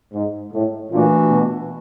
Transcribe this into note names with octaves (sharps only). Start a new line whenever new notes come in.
G#2
A2
A#2 E3 A3 D4 F#4
B2